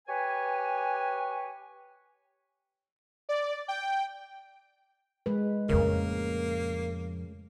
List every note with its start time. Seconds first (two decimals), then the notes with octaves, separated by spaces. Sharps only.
0.08 G4 B4 C#5 G#5
3.29 D5
3.68 G5
5.26 G#3 B4
5.69 F2 A2 C#3 A#3 A#4